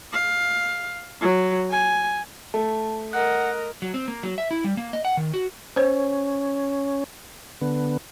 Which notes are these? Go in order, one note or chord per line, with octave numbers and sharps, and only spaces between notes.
F5
F#3
G#5
A3 A5
A#4 D#5 F#5 F#6
F#3
C4
A#3
F#3
E5
E4
G3
A#3
D#5
F#5
D#3
F#4
C#4 C5 C#5
D3 B3